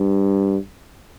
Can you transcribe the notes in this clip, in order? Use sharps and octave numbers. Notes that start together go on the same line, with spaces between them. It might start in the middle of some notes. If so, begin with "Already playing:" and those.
Already playing: G2